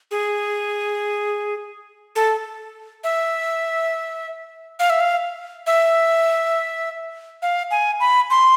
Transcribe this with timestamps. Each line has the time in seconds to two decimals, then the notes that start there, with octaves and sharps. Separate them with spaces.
0.11 G#4
2.15 A4
3.04 E5
4.79 F5
4.90 E5
5.00 F5
5.66 E5
7.42 F5
7.71 G#5
8.00 B5
8.30 C6